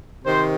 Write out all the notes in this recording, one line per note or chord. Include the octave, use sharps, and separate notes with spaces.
C3 D#3 C5